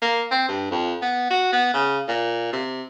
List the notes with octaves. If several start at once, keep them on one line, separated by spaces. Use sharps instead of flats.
A#3
C4
G2
F2
B3
F#4
B3
C#3
A#2
C3